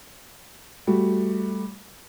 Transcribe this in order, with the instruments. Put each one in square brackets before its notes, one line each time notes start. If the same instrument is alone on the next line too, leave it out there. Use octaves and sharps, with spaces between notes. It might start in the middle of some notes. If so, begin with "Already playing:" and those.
[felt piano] G3 A3 F#4